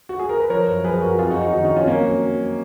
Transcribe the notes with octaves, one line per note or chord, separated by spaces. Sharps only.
F#4
G#4
A#4
B4
F3 A#4 C#5
F#2
F3 G#4 B4
F#2 F#4 A#4
F2 F4 G#4
D#4 F#4
F2
D#4 F#4
D#3 D#4 F#4
D#4 F#4
F2
C#4 F4
F#3 A#3 C#4
F#3
F#3